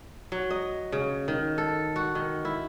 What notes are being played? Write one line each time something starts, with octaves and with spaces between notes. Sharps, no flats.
F#3
D#5
C#3
D#3
A4
F#4
D#3
E4